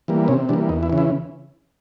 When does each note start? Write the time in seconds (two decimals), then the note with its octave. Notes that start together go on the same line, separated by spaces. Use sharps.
0.08 E3 G3 A#3
0.28 C3 C#4
0.49 E3 G3 A#3 D4
0.69 E2 D#4
0.83 E4
0.90 C#3 E3
0.98 E4